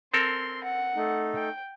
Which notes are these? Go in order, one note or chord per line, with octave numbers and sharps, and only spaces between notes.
C4 A4 A#4 C6
F#5
A3 D#4
G5